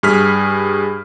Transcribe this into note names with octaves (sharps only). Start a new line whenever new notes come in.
G2 G#4 F6 B6